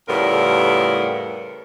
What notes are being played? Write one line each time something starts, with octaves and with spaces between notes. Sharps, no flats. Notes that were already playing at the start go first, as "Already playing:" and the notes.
F2 A2 C#3 G3 B3 A#4